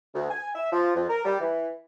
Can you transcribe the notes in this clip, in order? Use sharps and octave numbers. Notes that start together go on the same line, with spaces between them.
D2
G#5
E5
F3
F2
A#4
G3
E3